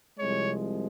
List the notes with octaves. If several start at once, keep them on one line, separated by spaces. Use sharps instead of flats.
C2 C3 F3 G#3 C#5